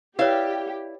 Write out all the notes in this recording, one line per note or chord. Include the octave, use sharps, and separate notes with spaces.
E4 G4 B4 C#5 D5 F5